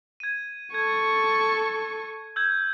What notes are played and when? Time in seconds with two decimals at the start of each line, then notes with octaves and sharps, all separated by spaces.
0.20 G#6 D#7
0.74 A4 C#6 G#6
2.36 E6 G6 G#6